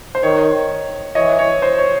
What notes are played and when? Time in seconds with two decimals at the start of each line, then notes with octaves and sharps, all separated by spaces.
0.15 C5
0.23 D#3 C#5
1.15 E3 C#5 D#5
1.39 C#5
1.62 C5
1.78 C#5